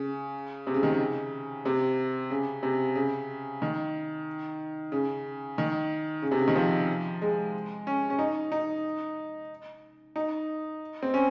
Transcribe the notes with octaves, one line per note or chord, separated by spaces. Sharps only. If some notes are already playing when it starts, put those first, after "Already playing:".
Already playing: C#3
C3
C#3
D#3
C#3
C3
C#3
C3
C#3
D#3
C#3
D#3
C#3
C3
C#3
D#3
F3
G#3
C#4
C#4
D#4
D#4
D#4
C4
C#4